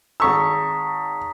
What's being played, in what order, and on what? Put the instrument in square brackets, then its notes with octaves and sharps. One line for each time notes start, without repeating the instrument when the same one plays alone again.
[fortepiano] G#1 C#6 E6 [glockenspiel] A#5 D#6 B6